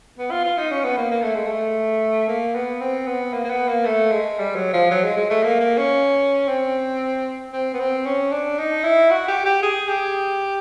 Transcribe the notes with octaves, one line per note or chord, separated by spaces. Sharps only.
B3
F4
F4
D#4
C#4
B3
A#3
A#3
A3
G#3
A3
A#3
B3
C4
B3
A#3
A#3
B3
A#3
A3
G#3
G3
F#3
F3
F#3
G#3
G#3
A3
A#3
A#3
C#4
C4
C4
B3
C4
C#4
D4
D#4
E4
F#4
G4
G4
G#4
G4